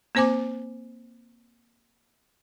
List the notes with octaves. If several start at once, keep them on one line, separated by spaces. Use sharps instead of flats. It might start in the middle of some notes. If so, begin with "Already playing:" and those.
A#3 C4 C5 G#5 D6